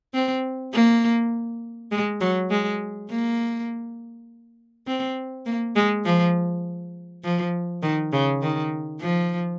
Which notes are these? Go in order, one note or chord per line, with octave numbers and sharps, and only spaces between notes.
C4
A#3
G#3
F#3
G#3
A#3
C4
A#3
G#3
F3
F3
D#3
C#3
D#3
F3